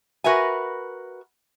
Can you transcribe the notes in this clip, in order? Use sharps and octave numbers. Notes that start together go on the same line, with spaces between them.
F#4 A#4 B4 E5 G#5